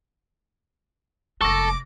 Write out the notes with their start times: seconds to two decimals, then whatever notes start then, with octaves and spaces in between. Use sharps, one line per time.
1.41 F1 G#3 A4 C#6 D6 A#6